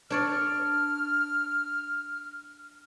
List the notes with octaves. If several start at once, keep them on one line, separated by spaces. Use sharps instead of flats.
D4 C#5 D5 F6